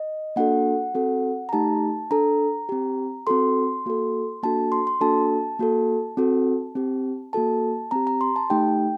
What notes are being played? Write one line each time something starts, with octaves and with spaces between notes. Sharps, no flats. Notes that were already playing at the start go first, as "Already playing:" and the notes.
Already playing: D#5
A#3 D4 F#4 A4 F#5
C4 F#4 A4
A#5
A3 D#4 G4 A5
D4 A4 A#5
C4 G4
C4 F#4 A4 C6
A#3 F#4 A4
A#3 D4 F#4 A4 A5
C6
C6
A#3 D4 F#4 A4 A5
A#3 F#4 A4
C4 F#4 A4
C4 G4
A#3 F#4 A4 A5
C4 G4 A#5
A#5
C6
A5
A3 D#4 G4 G5